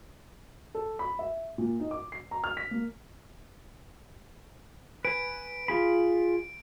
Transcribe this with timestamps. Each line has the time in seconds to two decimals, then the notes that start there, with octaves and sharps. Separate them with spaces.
0.75 A4
0.99 B5
1.19 E5
1.58 A#2
1.80 D#4
1.91 D6
2.12 C7
2.31 A#5
2.44 F6
2.57 B6
2.71 A#3
5.05 B4 G#5 D7
5.68 F4 G#4 B5